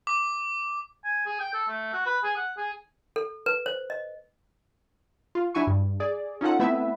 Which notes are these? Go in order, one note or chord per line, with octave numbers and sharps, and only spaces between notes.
D6
G#5
G#4
G5
A4
A3
F#4
B4
G#4
F#5
G#4
A4
B4
C5
D#5
F4
F#3 D4 E4 F#4 G#5 C#6
G2
G#4 D5
C#4 D#4 F4 A4 F#5
A3 B3 C4 E4 B4 E5